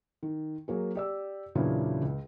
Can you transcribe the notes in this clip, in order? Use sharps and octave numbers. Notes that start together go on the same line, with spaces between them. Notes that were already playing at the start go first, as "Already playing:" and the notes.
D#3
F#3 A#3 G#4
G4 D5 E6
E2 A#2 C#3 F#3 D4 E4
C#2